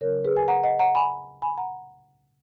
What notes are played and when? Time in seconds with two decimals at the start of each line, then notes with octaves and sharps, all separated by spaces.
0.01 C#3 F#3 C#4 A#4 C#5
0.24 G#4 B4
0.36 G#5
0.48 F#5 A#5
0.63 D#5 F#5
0.79 F#5 A#5
0.95 G#5 B5
1.42 G#5 B5
1.57 F#5 A#5